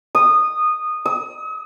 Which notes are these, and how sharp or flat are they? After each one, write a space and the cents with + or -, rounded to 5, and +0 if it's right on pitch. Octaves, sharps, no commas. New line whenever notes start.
D#6 -15
D#6 +45